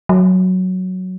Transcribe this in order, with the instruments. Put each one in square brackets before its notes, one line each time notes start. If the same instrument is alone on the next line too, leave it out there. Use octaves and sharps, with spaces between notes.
[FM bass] F#3